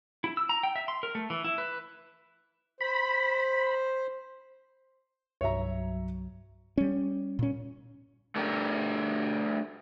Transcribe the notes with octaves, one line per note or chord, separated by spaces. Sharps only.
E4
E6
A#5
G5
E5
C6
A#4
A3
E3
E4
B4
C5 B5
C2 G2 F#3 C#5 E5 A#5
G3 C#4
A#2 C#4
A3 D4 G4 A#4